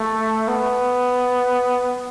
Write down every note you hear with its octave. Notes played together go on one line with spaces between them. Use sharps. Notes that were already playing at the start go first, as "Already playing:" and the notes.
Already playing: A3
B3